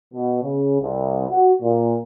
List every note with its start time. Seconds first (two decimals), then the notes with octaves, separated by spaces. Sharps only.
0.14 B2
0.43 C#3
0.81 C2
1.29 F#4
1.62 A#2